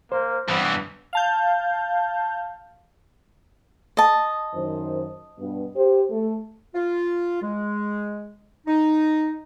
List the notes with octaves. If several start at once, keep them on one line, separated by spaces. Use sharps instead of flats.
A#3 C5
G2 E3 B3
F5 A5 G6
D#5 A5
F#2 D#3 C5
G2 B2
G4 C5
A3 A4
F4
G#3
D#4